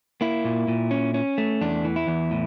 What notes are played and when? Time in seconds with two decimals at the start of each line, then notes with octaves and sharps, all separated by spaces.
0.21 A#3 E4
0.45 A#2
0.68 A#2
0.91 C#4
1.14 C#4
1.38 A3
1.61 E2 D4
1.84 E3
1.96 E4
2.08 E2
2.31 A2